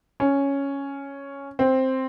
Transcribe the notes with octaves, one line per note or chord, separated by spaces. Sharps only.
C#4
C4